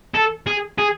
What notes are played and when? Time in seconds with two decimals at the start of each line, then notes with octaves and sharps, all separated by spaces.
0.15 A4
0.47 G#4
0.78 G#4